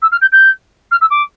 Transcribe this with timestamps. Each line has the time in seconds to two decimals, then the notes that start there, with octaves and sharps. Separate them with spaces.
0.02 E6
0.11 F6
0.21 G6
0.32 G6
0.91 F6
1.01 E6
1.10 D6